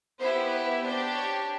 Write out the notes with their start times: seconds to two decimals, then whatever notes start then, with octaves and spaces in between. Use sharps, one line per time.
0.19 B3 E4 G4 C5
0.51 B4
0.83 D4 G4 C5
1.14 C#5